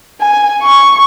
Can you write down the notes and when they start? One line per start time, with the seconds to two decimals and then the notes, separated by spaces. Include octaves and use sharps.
0.21 G#5
0.63 C#6